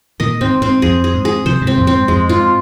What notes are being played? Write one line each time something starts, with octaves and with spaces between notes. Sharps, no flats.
A#2 D#3 D#5
G#2 C4
G#2 C4
F2 G#4
G#4
G#2
G#4
C3 F3 C5
G#2 C3
C4
F2 A#2
C4
G#2
F2 G#3
G#2 F4